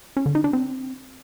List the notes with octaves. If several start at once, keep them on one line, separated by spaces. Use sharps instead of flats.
C#4
D3
D#4
D4
C4